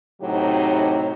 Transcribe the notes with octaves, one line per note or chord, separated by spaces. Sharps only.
A2 C3 F#3 D#4 G4